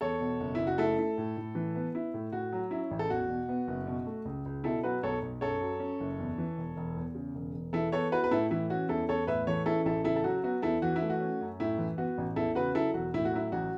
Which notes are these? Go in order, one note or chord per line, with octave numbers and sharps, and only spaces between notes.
E2 A4 C#5
B2
F#1
F#1 E4
F#4
A3 E4 A4
E4
A2
A2
E3
B3
E4
A2
A2 F#4
F#3
C#4 E4
A1
A4
E2 F#4
B2
B3
F#1
B2
A3
C#2
C#2
B2 E4 A4
F#3 F#4 B4
B1 A4 C#5
B1
F#2 A4 C#5
F#3
C#4
F#1
E2
E3
E1
E1
E2
C#3
E1
E1
E3 E4 A4
B3 A4 C#5
E4 F#4 B4
B4
A2 E4 A4
E3 E4
C#4 F#4
E2 E4 A4
E2 A4 C#5
A2 B4 E5
E3 A4 C#5
C#4 E4 A4
A1 E4 A4
C#3 E4 A4
A4
F#3 F#4
B3 F#4
E2 E4 A4
E3 F#4
E4
A3
F#4
C#4
F#2
A2 E4
E3
B3 F#4
A1
E2 E4 A4
C#3 F#4 B4
F#3 E4 A4
E1 F#4
A2 E4
F#4
F#3 E4
A1 F#4